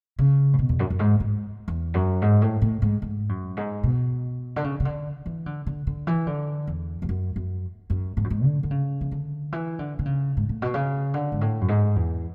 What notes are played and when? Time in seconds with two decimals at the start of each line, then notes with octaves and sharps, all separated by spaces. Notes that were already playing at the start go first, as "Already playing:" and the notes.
0.19 C#3
0.53 A2
0.59 B2
0.69 E2
0.79 F#2
0.90 F#2
0.99 G#2
1.20 G#2
1.68 E2
1.94 F#2
2.22 G#2
2.42 A2
2.62 A2
2.82 G#2
3.02 G#2
3.29 F#2
3.57 G#2
3.84 B2
4.56 D3
4.64 C#3
4.80 C#3
4.85 D3
5.26 E3
5.46 D3
5.67 D3
5.87 D3
6.07 E3
6.27 D3
6.67 E2
7.02 E2
7.09 F#2
7.36 F#2
7.90 F#2
8.17 G#2
8.24 F#2
8.30 G#2
8.44 D3
8.63 D3
8.71 C#3
9.01 E3
9.11 D3
9.53 E3
9.79 D3
9.99 D3
10.06 C#3
10.37 G#2
10.49 A2
10.62 B2
10.74 C#3
11.14 D3
11.32 G#2
11.41 A2
11.61 F#2
11.69 G#2
11.96 E2